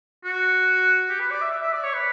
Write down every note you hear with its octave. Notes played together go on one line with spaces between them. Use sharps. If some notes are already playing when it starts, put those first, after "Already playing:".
F#4
G4
B4
D5
E5
E5
E5
D5
C#5
B4